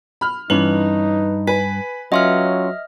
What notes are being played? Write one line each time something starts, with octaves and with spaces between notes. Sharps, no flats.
B5 F6
G2 E3 C#4 D#4 B4 F#7
B4 G#5 B6
F#3 C#4 F4 D#5 E5 F6